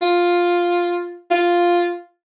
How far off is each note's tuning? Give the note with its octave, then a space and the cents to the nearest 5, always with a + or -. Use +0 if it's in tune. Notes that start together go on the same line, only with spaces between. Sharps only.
F4 +5
F4 +0